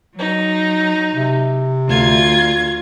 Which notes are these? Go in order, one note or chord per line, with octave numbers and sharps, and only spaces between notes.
F#3 D#4
C3
D2 F4 G#6